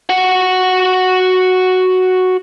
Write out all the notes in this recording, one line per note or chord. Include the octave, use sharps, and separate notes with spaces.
F#4 F#5